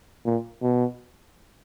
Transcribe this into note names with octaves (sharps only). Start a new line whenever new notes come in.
A#2
B2